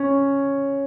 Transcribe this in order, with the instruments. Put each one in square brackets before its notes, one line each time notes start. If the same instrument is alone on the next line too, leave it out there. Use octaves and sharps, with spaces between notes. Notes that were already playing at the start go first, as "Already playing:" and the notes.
Already playing: [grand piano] C#4